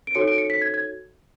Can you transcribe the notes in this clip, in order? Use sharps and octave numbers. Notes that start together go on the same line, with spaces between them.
D7
D#4 F#4 A4 C#5 C#7
D7
C#7
B6
G#6
G#6